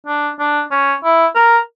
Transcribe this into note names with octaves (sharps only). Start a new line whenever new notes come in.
D4
D4
C#4
E4
A#4